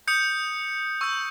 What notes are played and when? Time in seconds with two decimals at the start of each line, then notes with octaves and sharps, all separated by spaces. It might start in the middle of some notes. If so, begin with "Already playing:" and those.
0.08 D#6 G6 C#7
1.01 C#6 E6 G6